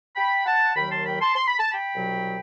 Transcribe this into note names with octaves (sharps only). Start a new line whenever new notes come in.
G5 B5
F#5 A5
D#2 D#3 F#3 G5 B5
A5 C6
G5 B5
A5 C6
C6
B5
A5
G5 B5
C2 B2 F#3